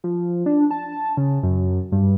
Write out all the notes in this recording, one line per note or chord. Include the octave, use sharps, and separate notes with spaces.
F3
D4
A5
C#3
F#2
G2